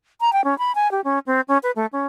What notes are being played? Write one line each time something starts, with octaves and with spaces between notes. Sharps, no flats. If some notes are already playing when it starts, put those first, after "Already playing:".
A#5
G5
C#4
B5
G#5
G4
C#4
C4
C#4
B4
A3
C#4